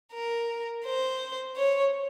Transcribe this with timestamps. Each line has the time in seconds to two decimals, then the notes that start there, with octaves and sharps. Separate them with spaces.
0.13 A#4
0.85 C5
1.57 C#5